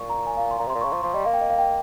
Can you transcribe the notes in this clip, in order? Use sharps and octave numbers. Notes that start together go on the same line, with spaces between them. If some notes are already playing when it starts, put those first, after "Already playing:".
Already playing: A#2 C#6
A#5
G#5
F5
C6
A#2 A#5
C3 C6
A#2
C#3 C#6
F3 C6
F3 C6
G3 D#5
A#3 F5
G5
D#5
F5
G5